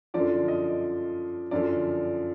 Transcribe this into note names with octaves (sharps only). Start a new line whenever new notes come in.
F#2 D3 F3 D5
D#5
F#2 D3 F3 D5